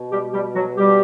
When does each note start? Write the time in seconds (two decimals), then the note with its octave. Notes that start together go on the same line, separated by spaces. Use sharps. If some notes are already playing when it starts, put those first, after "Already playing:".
Already playing: B2
0.11 G3 G4
0.33 G3 G4
0.54 F#3 F#4
0.76 G3 G4